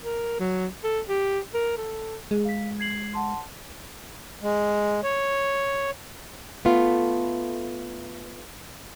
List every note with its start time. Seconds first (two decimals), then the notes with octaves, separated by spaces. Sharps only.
0.05 A#4
0.40 F#3
0.84 A4
1.09 G4
1.54 A#4
1.78 A4
2.31 G#3 G#4
2.45 F5 B6
2.80 G#6 C7 F#7
3.14 F#5 A5 C6
4.42 G#3
5.03 C#5
6.65 A3 B3 F4